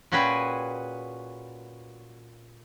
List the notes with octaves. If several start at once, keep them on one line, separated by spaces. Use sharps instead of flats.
A#2 C#4 F#4 G#4 B4 G5